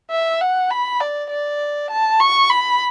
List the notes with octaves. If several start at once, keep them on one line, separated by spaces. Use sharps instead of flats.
E5
F#5
B5
D5
D5
A5
C#6
B5